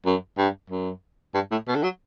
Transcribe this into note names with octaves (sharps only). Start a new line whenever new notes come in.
F#2
G2
F#2
G2
A2
B2
D3
F#3